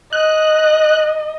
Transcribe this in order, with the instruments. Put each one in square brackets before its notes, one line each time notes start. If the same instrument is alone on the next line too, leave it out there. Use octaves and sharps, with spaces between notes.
[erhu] D#5 [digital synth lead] F#6